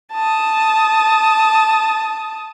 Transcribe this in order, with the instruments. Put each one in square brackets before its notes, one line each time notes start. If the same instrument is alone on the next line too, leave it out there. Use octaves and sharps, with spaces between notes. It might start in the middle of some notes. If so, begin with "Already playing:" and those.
[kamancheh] A5 D#6